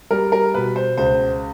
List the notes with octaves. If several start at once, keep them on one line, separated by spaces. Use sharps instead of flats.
G3 A#4
A#4
B2 B4
C5
C#2 C5